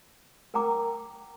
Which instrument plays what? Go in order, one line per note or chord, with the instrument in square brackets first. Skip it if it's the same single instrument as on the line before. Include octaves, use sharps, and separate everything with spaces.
[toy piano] A#4 F#5 G5 A#5 D6